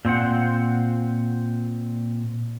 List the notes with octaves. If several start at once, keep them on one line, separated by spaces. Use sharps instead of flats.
A#2 C4 C5 F#5